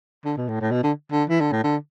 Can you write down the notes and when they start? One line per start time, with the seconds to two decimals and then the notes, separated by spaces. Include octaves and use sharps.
0.25 D3
0.37 B2
0.48 A2
0.61 A2
0.71 B2
0.84 D3
1.12 D3
1.29 E3
1.41 D3
1.52 A2
1.64 D3